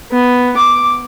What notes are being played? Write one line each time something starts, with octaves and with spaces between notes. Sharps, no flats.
B3
D6